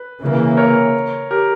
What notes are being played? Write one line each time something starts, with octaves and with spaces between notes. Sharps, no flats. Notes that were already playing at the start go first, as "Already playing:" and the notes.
Already playing: B4
C#3 E3 A#3
A#4 C#5
G4 A#4